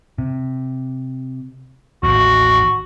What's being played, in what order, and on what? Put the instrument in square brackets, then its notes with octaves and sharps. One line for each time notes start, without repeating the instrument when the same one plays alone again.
[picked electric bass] C3
[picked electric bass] A1 D#2 [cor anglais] F#4